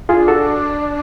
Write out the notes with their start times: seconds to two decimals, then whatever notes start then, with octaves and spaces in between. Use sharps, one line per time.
0.09 E4 F4 G#4
0.15 D4
0.28 F#4 A4